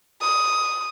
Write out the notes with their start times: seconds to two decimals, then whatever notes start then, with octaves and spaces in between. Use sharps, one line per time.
0.22 D#6